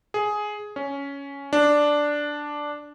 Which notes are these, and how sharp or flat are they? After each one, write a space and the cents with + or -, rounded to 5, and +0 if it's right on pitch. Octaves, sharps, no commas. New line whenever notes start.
G#4 +10
C#4 +10
D4 +0